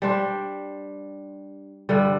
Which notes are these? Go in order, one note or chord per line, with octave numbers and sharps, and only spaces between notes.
G3 D4 G4 C5
G2 D3 G3